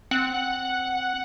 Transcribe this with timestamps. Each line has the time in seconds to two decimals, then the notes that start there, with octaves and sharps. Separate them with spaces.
0.11 C4 F#5